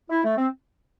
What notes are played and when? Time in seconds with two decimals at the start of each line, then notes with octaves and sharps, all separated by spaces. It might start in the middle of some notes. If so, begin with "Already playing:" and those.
0.10 E4
0.24 A3
0.38 C4